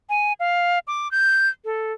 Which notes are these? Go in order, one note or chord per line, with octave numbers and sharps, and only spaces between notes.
G#5
F5
D6
G6
A4